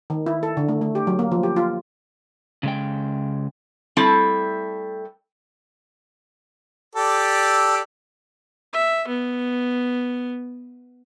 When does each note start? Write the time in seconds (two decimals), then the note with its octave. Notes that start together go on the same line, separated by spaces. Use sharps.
0.10 D#3
0.26 E4
0.43 A4
0.57 D3
0.69 A3
0.81 A3
0.95 G4
1.07 F#3
1.19 A#3
1.32 F3
1.43 G4
1.56 F4
2.63 C#3 G#3 G5
3.97 G3 A3 C4 E4 A4
6.95 G4 A4 D5
8.73 E5
9.08 B3